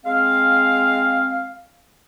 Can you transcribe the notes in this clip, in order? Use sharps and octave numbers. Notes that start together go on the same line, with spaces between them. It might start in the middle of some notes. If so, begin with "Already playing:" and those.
G#3 C4 F5